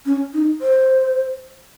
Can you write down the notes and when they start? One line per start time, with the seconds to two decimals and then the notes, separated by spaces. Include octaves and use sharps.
0.06 C#4
0.33 D#4
0.61 C5